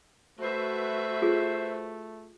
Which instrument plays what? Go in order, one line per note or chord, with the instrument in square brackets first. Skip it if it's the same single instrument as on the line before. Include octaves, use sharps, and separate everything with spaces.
[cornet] A3 [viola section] F#4 B4 E5 [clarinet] C5
[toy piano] F4 G#4